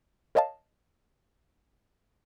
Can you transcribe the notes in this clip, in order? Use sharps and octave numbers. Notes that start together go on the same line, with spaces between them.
A#4 C#5 D#5 F5 A5